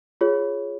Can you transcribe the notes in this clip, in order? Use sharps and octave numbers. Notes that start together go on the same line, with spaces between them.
F4 G#4 C#5